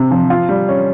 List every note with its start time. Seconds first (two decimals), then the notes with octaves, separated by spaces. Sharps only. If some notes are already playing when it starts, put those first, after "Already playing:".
Already playing: C3 C4
0.11 F3
0.30 F4
0.49 G3
0.68 C#4